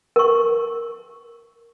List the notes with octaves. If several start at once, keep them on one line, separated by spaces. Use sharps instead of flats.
A#4 C#6